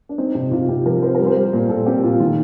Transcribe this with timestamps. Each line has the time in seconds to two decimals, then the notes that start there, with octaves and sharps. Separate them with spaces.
0.09 D4
0.18 C4 D#4
0.35 C3 D#4
0.51 C3 F4
0.69 C3 G4
0.85 F3 A#4
1.02 C4 C5
1.15 G3 A#4
1.27 C5
1.37 G3
1.53 A#2
1.69 A#2 A4
1.86 C4 G4
2.03 A#2 F4
2.20 D#3 F4